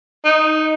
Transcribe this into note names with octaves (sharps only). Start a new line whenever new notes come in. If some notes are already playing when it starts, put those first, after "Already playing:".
D#4